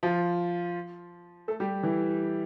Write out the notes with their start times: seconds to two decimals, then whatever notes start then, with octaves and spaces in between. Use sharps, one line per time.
0.03 F3 F4
1.48 A3 A4
1.60 G3 G4
1.83 E3 E4